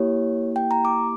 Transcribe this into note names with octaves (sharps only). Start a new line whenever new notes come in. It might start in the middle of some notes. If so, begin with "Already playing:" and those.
Already playing: A#3 E4 G4 C#5
G5
A#5
D6